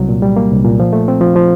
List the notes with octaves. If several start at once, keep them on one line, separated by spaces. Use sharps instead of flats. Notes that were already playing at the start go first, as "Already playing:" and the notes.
Already playing: C2 F#3
A#2
G3
A#3
C2
A#2
F3
A3
C4
F3
F3